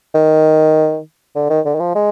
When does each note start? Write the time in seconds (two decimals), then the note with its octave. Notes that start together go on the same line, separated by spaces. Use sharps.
0.15 D#3
1.36 D3
1.50 D#3
1.65 D3
1.75 D#3
1.80 F3
1.95 G#3